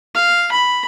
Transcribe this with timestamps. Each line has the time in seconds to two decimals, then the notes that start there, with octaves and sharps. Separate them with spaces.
0.15 F5
0.52 B5